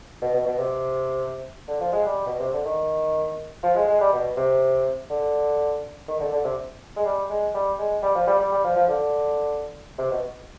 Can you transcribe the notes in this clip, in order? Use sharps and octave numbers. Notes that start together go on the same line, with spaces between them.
B2
B2
B2
C3
D3
F3
G#3
G3
B2
C3
D3
D#3
F3
G#3
G#3
G3
B2
C3
D3
D#3
D3
D3
C3
G#3
G3
G#3
G3
G#3
G3
F3
G3
G3
G3
F3
F3
D3
C3
B2